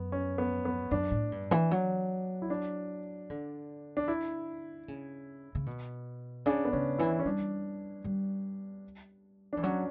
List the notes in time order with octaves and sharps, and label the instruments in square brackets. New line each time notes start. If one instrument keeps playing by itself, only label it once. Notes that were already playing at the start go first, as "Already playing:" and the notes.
Already playing: [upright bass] F#2 [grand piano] B3
[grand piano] C#4
B3
B3
[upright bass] F#2 [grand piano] D4
[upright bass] A2
G2
E3
F#3
[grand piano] E4
D4
[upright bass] D3
[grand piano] D4
E4
[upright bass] C#3
C#3
B2
[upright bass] C#3 [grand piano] D4
[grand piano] B3
[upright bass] C#3 [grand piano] C#4
[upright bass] E3 [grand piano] E4
[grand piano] C#4
[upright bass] G3 [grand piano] D4
[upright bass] G3
[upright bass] E3 [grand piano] D4
[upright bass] F#3 [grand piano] C#4